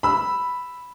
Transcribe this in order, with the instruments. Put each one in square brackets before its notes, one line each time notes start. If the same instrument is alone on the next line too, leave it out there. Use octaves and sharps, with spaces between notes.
[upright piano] B5 E6